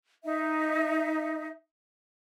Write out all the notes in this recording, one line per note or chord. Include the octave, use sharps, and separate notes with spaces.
D#4 E5